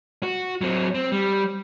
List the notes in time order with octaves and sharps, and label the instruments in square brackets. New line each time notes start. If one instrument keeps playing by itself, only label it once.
[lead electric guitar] F#4
F#3 C4
C4
G3